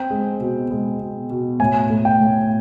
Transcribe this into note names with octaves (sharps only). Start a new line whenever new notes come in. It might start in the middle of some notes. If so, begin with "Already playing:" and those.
Already playing: C4 G5
G#3
B2
G#3
B2
B2
A2 G#5
A3
G5
A2